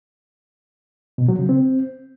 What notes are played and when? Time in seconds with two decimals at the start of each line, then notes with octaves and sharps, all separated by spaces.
1.18 B2
1.28 F#3
1.39 C#3
1.49 C4